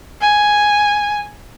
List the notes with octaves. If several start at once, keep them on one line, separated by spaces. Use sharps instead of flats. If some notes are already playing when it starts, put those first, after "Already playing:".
G#5